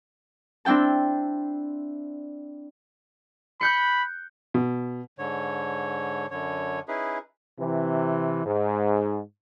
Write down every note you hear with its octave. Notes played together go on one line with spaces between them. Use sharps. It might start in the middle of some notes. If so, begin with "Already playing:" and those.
C4 D4 E4 G5 A5
B5 F#6 G6 C#7
B2
G#2 D3 C#5
F#2 D3 C#5
C#4 D#4 E4 G#4 B4
C3 E3
G#2